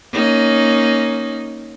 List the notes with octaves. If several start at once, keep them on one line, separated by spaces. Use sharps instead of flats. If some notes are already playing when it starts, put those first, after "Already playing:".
A#3 C#4 D#4